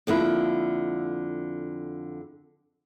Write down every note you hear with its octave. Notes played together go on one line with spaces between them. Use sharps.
F2 D3 A#3 E4